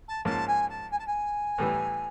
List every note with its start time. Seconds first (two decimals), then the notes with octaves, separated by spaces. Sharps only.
0.08 A5
0.25 G#2 F3 A#3 C#4 A5
0.48 G#5
0.69 A5
0.91 G#5
0.99 A5
1.07 G#5
1.58 A2 E3 G3 B3